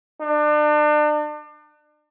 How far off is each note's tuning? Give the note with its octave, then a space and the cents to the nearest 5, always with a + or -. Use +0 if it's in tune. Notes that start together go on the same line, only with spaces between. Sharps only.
D4 +35